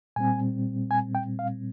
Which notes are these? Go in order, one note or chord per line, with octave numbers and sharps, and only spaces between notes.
A#2 G3 C4 G#5
G#5
G5
F5